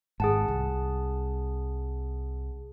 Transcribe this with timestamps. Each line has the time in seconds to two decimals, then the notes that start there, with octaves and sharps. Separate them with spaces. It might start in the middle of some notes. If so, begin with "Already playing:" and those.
0.20 G#1 G#2 G#4 F#5 A5
0.48 C2